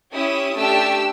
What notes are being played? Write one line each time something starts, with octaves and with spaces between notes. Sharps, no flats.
C#4 E4 G4 D#6
A3 D4 G4 E6